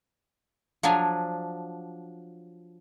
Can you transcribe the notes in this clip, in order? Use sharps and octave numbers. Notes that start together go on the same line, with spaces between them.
F3 F#3 D4 G#5